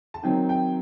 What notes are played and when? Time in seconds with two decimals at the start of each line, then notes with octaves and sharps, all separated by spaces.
0.14 A5
0.23 D#3 F#3 C4 D#4 G5
0.49 G5